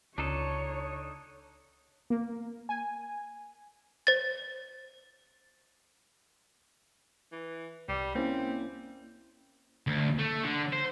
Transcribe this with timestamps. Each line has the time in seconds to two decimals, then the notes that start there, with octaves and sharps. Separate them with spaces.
0.18 C#2 D4 D#4 A4 C#5
2.10 A#3
2.69 G#5
4.07 C5 A6
7.32 E3
7.88 C2 G3
8.15 A#3 C4 C#4 E4
9.87 D2
10.19 A3
10.43 D3
10.73 C5